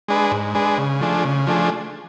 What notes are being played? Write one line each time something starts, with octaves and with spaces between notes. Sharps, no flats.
G#3 D4 G#4 B4
G#2
G#3 D4 G#4 B4
C#3
F3 A3 D4 G#4
C#3
F3 A3 D4 G#4